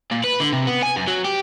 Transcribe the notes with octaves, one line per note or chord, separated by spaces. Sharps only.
A#2
B4
D3
C3
B3
G#5
F#2
F#3
G4